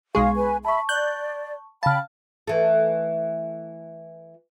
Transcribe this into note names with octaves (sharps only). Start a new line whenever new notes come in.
B1 G#3 G#4 F5 C#6
B4 G#5
E5 A5 B5 C#6
D5 F#6 G6
C#3 F5 G5 A5 B5 F6
E3 A3